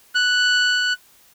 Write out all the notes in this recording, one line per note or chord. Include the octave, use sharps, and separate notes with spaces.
F#6